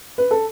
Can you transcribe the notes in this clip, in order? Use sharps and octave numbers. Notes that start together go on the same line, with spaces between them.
B4
A4